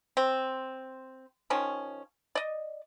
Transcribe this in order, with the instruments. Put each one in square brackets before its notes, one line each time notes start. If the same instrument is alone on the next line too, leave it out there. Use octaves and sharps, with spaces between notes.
[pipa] C4
D#3 F3 C#4
D5 D#5